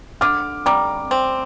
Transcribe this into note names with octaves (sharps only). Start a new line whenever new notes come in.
D3 D6 F6
G3 A#5 D6
C4